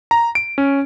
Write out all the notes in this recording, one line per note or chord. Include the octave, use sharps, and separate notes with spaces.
A#5
D7
C#4